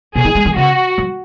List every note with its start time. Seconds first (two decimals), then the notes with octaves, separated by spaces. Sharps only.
0.15 B2 G#4
0.25 D#3
0.35 G#3
0.45 D#3
0.56 C#3 F#4
0.98 F#3